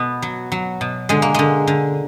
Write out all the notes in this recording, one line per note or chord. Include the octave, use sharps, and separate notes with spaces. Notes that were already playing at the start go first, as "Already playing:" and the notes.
Already playing: B2 B3
F#3
F#3
B2
D3 G#3
A#3
D3 G#3
D3